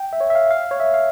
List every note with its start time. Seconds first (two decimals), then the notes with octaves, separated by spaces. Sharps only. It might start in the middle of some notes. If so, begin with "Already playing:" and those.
Already playing: G5
0.13 E5
0.20 C#5
0.30 E5
0.35 F5
0.51 F5
0.71 C#5
0.80 E5
0.94 F5